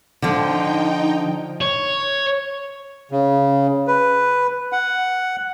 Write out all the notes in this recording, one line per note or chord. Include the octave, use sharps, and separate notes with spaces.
D3 F3 D#4 G5
C#5
C#3
B4
F#5